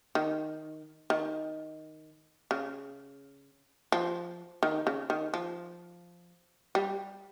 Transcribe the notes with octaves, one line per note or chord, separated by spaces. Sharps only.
D#3
D#3
C#3
F3
D#3
C#3
D#3
F3
G3